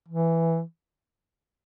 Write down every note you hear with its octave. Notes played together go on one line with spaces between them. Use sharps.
E3